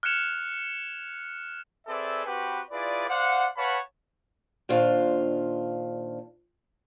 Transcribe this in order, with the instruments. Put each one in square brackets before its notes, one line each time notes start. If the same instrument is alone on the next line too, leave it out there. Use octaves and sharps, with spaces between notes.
[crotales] F6 F#6 G#6 C#7 E7 F7
[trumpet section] C4 G#4 A4 B4 D5 E5
C4 F#4 G4 B4
E4 F4 G#4 B4 D5
C5 D5 F5 F#5
B4 C#5 F5 F#5 A5 B5
[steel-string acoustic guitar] A#2 D#3 D4 F4 C5 F5